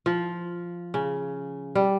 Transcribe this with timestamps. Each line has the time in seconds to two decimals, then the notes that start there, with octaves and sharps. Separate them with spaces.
0.06 F3
0.94 C#3
1.75 G3